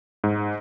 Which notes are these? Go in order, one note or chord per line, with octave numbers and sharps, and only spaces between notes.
G#2